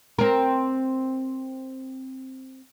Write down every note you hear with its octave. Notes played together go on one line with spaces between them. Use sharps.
C4 A#4